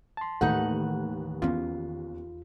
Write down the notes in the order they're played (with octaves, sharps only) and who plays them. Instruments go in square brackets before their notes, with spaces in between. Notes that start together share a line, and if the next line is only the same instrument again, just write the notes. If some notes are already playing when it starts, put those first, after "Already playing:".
[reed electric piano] A5 C6
[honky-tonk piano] D#2 [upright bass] A2 E3 [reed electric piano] A3 [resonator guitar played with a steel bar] D#4 B4 F#5
[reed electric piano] E2 F4 [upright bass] B3 C#4